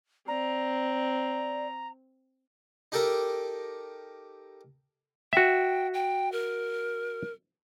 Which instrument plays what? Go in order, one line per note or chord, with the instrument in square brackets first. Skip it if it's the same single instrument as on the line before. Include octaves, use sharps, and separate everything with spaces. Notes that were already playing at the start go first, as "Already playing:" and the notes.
[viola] C4 [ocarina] D5 [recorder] A#5
[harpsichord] D#4 G4 A4 A#4 A#5
[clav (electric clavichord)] F#4 E5 [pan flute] G5
[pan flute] G5
A#4